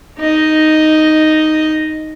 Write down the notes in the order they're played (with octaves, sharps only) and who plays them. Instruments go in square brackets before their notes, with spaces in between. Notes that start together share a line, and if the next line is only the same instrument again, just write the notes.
[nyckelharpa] D#4 D#5